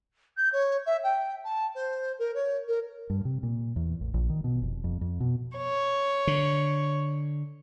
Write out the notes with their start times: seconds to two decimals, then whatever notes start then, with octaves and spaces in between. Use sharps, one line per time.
0.37 G6
0.53 C#5
0.86 E5
1.03 G5
1.44 A5
1.75 C5
2.19 A#4
2.35 C#5
2.68 A#4
3.10 G2
3.25 C3
3.43 A#2
3.76 E2
4.01 A1
4.14 A#1
4.30 D#3
4.44 B2
4.62 F1
4.84 F2
5.01 F2
5.20 B2
5.56 C#5
6.27 D3